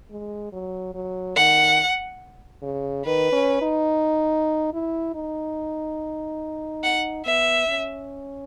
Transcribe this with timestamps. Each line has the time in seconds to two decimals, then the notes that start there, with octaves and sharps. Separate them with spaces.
0.11 G#3
0.53 F#3
0.95 F#3
1.37 D#3 F#5
2.63 C#3
3.05 D#3 B4
3.33 C#4
3.62 D#4
4.73 E4
5.15 D#4
6.84 F#5
7.26 B3 E5
7.68 C#4